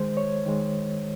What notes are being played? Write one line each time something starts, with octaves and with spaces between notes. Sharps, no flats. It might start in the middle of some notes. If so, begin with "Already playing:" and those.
Already playing: D#3 G#3 C5
C#5
D#3 G#3